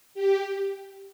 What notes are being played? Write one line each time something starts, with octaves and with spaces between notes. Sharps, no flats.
G4